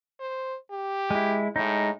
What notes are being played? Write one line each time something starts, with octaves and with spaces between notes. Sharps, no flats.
C5
G4
G#3 E4
A2 G#3 D#4